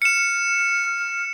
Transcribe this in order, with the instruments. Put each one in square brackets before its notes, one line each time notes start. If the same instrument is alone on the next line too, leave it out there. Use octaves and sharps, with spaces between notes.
[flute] F6 [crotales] C#7 E7